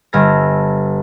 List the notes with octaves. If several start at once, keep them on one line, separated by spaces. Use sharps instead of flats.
G1 A4 F6 G#6 A#6